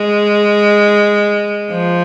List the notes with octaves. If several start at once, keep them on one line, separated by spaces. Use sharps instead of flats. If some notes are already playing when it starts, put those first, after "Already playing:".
Already playing: G#3
F3